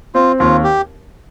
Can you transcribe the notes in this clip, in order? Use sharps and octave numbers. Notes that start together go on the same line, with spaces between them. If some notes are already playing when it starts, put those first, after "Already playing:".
C4 F4
D#2 F4
G4